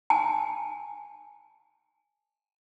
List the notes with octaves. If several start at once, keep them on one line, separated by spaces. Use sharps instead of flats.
G#5 A5